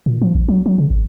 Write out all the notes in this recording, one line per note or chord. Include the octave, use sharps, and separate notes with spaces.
A#2
F3
A#1
F#3
F#3
C#3
G#1